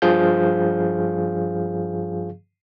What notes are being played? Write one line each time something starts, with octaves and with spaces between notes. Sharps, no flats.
G2 F3 G#4 F5 G6